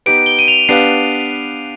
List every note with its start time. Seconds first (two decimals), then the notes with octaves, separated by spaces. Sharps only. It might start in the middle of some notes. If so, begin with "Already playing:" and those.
0.06 B3 D#4 G4 B4 D7
0.26 G7
0.39 D#7
0.48 F7
0.69 B3 D4 G4 B4 F5 C7